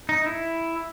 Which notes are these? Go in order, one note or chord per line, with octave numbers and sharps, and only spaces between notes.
D#4
E4